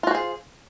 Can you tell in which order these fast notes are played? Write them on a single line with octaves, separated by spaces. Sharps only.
F4 F#4 C5 G#4